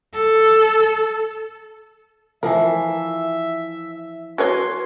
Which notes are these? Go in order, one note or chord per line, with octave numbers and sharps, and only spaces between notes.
A4
E3 F3 A#4 E5
F#4 B4 C#5 C6